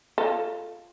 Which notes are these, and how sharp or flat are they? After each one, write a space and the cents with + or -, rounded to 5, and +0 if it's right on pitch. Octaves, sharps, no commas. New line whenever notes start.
F4 +0 A4 +0